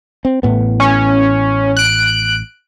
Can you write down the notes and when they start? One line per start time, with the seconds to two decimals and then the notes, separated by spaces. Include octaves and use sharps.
0.25 C4
0.43 A1 A2 B3
0.80 C#4
1.77 F#6 D7